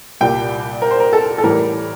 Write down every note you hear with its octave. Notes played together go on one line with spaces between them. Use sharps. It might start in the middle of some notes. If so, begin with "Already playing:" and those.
C2 A#2 G3 G5
A#4
C5
A#4
A4
A4
A2 E3 G3 A#4